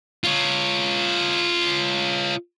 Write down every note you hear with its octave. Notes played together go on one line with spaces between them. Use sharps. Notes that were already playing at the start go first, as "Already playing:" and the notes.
F4 C#5